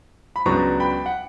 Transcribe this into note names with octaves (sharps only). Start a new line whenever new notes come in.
B5
C#2 C#3 F#3 B3 D4 A#5 C#6
G5 B5
F#5